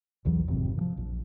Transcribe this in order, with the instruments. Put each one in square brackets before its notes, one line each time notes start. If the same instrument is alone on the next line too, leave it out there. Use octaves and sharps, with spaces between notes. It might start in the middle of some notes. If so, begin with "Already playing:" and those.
[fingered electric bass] A#1 E2 E3 F#3
G#1 F2 C3
D#3 F3
A#1